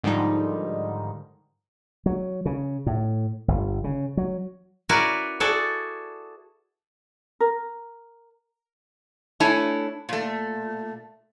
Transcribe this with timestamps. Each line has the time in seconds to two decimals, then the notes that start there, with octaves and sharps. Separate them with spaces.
0.04 G#2 D3 D#3 F3 G3 D#4
2.06 F#3
2.45 C#3
2.86 A2
3.48 G1
3.84 C#3
4.17 F#3
4.89 C#4 E4 F#4 A#4 B4 D5
5.40 F#4 G#4 A4 D5
7.40 A#4
9.40 A3 D4 E4 C#5 G#5
10.09 A#2 A3